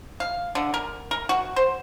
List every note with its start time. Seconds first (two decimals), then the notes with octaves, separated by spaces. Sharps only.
0.20 F5
0.55 D3
0.74 A#4
1.11 A#4
1.29 F#4
1.56 C5